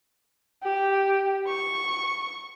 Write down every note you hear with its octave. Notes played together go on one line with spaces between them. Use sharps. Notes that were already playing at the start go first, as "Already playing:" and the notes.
G4
C#6